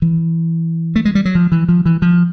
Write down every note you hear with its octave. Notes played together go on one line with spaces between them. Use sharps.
E3
A3
G#3
G3
F#3
F3
E3
F3
E3
F3